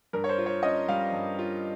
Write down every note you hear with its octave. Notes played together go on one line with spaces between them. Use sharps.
G2 A#4
C#5
C5
F4
C#5
C#4 D#5
G3 F5
G2
F4